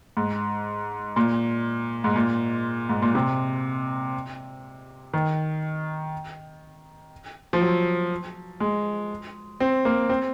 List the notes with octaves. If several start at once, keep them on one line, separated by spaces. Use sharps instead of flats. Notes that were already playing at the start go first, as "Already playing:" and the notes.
G#2
A#2
G#2
A#2
G#2
A#2
C3
D#3
F3
F#3
G#3
C4
A#3
C4